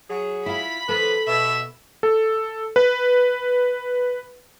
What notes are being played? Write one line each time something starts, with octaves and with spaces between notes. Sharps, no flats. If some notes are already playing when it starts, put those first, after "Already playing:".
F#3 G#4
E4 F4 B5
D#3 F3 A4 B4
B2 E5
A4
B4